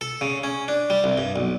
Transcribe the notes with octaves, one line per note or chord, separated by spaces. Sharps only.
A4
C#3
C#4
D4
G3
C2
G2
B1